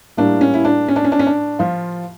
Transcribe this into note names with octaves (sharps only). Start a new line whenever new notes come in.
A2 G3 A#3 D4
C#4
E4
D4
C#4
D4
C#4
D4
C#4
D4
F3 F4